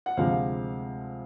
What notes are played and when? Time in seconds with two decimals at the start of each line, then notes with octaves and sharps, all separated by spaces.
0.06 F#5
0.17 D2 C3 F3 G#3 F5